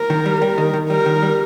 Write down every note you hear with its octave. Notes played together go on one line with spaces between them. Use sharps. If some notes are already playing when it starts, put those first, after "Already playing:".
Already playing: A#4
D#3
G3
G3
D#3
D#3
G3 A#4
D#3
G3